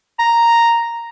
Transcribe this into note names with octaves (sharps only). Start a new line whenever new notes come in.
A#5